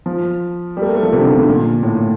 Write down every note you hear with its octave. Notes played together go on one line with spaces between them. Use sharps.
F3
G3
A3
A#3
A3
F3
C3
D3
F3
D3
A#2
A2